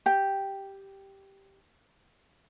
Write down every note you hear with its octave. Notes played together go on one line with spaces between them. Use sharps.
G4 G5